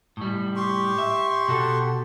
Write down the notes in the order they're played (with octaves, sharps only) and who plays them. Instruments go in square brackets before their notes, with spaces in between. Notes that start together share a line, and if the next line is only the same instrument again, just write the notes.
[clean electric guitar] A2 G3
[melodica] G4 C6 C#6
[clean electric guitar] E5
B2 F#4 A4